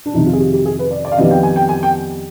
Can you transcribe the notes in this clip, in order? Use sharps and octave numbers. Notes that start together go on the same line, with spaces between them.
D4
F2 C3 D#3 D#4
F4
G#4
G4
G4
G#4
B4
D5
D5
F5
F2 D#3 G3 B3 D#5
G5
G#5
G5
G#5
G5